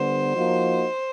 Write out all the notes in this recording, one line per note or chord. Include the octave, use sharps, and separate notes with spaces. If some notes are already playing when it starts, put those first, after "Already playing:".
Already playing: D3 G3 B3 C5
F3 A#3 D#4 F#4